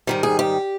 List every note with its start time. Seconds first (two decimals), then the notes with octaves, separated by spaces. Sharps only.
0.07 G#2 D#3 G3 A#4
0.23 G#4
0.39 G4